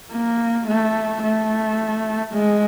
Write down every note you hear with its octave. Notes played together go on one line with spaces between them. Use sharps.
A#3
A3
A3
G#3